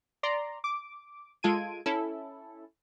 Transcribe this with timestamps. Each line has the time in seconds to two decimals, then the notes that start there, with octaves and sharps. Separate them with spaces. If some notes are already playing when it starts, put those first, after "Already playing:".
0.23 D5 A#5 C6
0.64 D6
1.43 G#3 F4 A4 G#6 D7 D#7
1.86 C#4 E4 A4